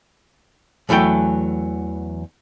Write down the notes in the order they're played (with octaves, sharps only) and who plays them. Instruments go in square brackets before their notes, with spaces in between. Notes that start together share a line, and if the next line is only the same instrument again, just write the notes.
[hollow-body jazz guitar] E2 E3 F#3 A3 G5